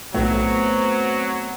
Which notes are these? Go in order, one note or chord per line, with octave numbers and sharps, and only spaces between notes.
B1 A2 F#3 A3 B3 C4 F#4